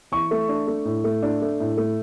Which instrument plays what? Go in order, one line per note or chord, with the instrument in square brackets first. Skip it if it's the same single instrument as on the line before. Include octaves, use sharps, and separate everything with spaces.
[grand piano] E3 C#6
A3
D4
A3
A2
A3
D4
A3
A2
A3